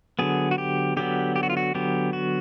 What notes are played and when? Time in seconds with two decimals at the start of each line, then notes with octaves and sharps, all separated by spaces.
0.19 D3 F#3 B3 G#4
0.51 F#4
0.58 G4
0.97 D3 F#3 B3 G4
1.36 G4
1.43 F#4
1.50 F4
1.57 F#4
1.75 D3 F#3 B3 G4
2.13 F#4